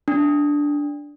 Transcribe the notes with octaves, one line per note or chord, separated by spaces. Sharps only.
D4